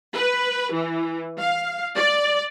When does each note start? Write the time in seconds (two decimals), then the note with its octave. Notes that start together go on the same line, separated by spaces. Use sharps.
0.14 B4
0.73 E3
1.38 F5
1.96 D5